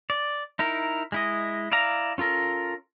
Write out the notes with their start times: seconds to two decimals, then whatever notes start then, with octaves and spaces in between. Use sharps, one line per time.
0.10 D5
0.59 D#4 E4 A#4
1.12 G#3 E4 D#5
1.72 E4 D5 F5 A#5
2.18 C#4 F4 A4 A#4